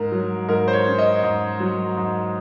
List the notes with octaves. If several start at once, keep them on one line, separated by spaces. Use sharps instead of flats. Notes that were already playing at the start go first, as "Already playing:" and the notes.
Already playing: G#2 A#4
F#3
G#2 A#4
C5
C#5
C#4
D#5
G#2
F#3
G#2